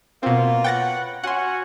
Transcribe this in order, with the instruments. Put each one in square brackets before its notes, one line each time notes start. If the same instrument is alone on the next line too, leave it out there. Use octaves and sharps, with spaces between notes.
[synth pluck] B2 C4 [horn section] A#3 F4
[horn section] B4 C#5 F#5 [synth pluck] G5 A6 A#6
[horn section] C#4 F#4 [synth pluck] F#5 C6